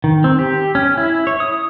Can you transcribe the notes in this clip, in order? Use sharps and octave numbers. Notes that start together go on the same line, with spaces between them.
D#3
C4
G4
C#4
E4
C#5
D#6